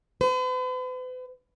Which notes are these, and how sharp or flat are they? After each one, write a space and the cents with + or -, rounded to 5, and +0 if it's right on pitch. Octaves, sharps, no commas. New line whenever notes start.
B4 +45